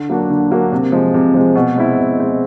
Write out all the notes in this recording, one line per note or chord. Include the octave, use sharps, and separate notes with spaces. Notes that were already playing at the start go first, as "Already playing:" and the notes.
Already playing: D3
F#3 A#3 D4 F#4
D3
F#3 A#3 D4 F#4
C3
F3 G#3
C3
F3 G#3
B2
G#3 C4 E4
B2
G#3 C4 E4